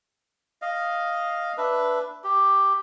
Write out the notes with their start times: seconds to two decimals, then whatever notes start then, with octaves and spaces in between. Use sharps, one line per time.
0.62 D#5 F5
1.58 D4 B4 E5
2.24 G4